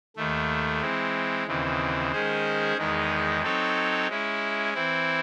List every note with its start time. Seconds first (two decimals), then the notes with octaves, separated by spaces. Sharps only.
0.16 D#2 D#3 A3
0.81 E3 G#3 C4
1.47 D#2 C#3 E3 C4
2.12 D#3 G#3 C#4 G#4 C5
2.77 E2 D#3 G#3 D#4
3.42 F#3 C4 D#4 A4 C#5
4.08 G#3 C#4 E4
4.74 E3 C4 E4